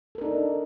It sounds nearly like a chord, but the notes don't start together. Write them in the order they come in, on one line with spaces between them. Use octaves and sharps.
A4 A#4 D4 D#4